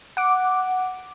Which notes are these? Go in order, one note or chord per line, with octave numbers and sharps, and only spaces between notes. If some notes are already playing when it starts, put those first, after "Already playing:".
F#5 D6